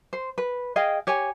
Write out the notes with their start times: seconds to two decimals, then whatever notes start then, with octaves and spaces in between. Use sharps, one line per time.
0.13 C5
0.38 B4
0.76 G#4 D#5 F5 G5
1.07 G4 C#5 G#5